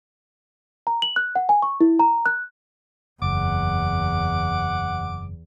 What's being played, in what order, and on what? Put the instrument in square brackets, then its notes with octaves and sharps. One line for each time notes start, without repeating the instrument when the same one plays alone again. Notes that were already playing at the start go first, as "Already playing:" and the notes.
[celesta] A#5
F#7
F#6
F#5
G#5
C#6
E4
A#5
F#6
[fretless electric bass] F#1 [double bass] E2 [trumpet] F#5 [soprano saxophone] D6